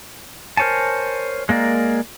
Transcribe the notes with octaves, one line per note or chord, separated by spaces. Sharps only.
A#4 C5 C#5 G#5 A5
G#3 A#3 A#4 D5